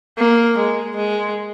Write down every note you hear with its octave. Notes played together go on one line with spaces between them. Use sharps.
A#3
G#3
G#3